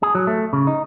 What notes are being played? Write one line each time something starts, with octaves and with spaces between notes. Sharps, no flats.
G#4
F#3
A3
C#3
D#4